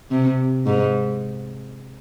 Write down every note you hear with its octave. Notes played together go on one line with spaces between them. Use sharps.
C3
G#2